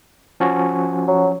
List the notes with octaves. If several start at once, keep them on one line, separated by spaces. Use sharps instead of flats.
F3 C#4 F#4
F#3